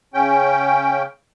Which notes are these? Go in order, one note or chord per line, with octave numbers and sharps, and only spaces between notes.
C#3 C#4 G5